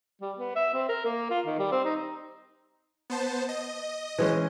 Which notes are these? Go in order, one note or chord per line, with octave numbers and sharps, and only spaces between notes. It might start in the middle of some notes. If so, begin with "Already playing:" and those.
G3
B3
E5
C4
A#4
A#3
F4
D#3
G3
C4
D#4
B3 C5 A5
D#5
E3 G#3 C#4